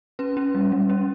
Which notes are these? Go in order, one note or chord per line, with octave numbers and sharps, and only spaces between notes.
C#4 B4
C#4
G3
G3
C#4